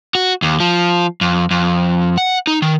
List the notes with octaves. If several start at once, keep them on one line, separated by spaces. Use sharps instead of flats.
F#4
D#2
F3
F2
F2
F#5
D#4
D#3